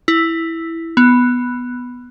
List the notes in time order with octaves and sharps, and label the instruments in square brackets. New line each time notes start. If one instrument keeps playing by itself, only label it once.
[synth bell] E4
B3